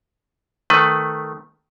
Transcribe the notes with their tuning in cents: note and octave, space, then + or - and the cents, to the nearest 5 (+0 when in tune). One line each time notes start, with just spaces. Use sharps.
D#3 +0 A3 +0 B4 +15